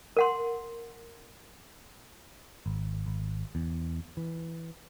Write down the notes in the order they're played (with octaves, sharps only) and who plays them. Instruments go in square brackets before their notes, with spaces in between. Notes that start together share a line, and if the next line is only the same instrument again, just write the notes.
[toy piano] A#4 F#5 C6
[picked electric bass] G#1
G#1
E2
E3